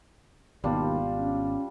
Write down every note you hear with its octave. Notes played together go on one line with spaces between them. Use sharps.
G#1 D#2 B2 G3 B3 D4 F4
C#4